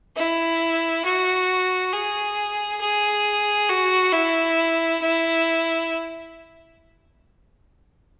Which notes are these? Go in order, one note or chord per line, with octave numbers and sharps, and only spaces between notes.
E4
F#4
G#4
G#4
F#4
E4
E4